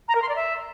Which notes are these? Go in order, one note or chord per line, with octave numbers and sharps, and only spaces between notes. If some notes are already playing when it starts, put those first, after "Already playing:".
A#5
A#4
C6
D5
E5